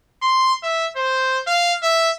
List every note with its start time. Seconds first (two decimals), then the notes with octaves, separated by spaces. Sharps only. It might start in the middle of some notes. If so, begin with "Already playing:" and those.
0.22 C6
0.63 E5
0.96 C5
1.47 F5
1.83 E5